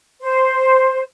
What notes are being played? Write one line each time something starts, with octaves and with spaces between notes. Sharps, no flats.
C5